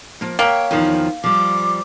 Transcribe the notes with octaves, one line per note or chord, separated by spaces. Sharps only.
F3 A#3
A#3 C#5 E5 G5
E2 D#3 F3
F3 G3 D6